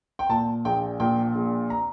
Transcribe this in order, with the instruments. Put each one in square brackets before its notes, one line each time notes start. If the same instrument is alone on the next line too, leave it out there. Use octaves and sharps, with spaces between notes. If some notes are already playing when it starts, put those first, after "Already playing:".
[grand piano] G5
[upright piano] A#2 [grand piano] A5
[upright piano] A#1 [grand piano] G5
[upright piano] A#2 [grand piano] G5
[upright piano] A#1
[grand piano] A#5